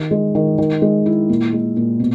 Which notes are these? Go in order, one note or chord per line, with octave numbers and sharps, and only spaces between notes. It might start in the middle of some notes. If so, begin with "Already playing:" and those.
Already playing: D#3
G#3
D#3
D#3
G#3
E4
A#2
G#3
A#2
B2